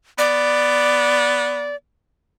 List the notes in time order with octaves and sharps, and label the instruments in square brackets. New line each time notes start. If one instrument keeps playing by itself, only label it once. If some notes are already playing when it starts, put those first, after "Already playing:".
[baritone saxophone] B3 [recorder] D5